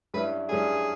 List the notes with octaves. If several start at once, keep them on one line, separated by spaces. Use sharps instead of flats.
G2 G3 C#4 E4 B4
G2 G3 C#4 E4 G#4